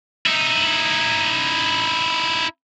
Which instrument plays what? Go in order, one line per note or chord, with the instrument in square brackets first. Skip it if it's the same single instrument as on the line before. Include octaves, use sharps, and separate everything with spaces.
[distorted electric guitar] D#4 E4